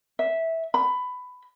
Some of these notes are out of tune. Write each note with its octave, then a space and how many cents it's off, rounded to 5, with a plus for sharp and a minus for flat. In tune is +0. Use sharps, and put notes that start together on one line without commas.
E5 -10
B5 +15